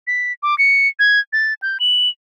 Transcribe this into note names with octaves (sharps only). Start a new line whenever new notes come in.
B6
D6
C#7
G#6
A6
G6
F#7